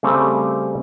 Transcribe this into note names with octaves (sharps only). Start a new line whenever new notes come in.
C#3 G3 A3 C4